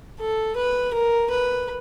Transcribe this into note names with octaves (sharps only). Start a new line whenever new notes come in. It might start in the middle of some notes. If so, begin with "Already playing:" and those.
A4
B4
A#4
B4